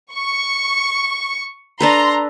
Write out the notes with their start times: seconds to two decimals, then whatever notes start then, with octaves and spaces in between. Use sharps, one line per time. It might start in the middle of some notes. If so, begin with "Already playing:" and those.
0.12 C#6
1.80 D4 A4 B4 A#5 C6